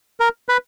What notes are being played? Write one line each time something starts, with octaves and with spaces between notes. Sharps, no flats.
A#4
B4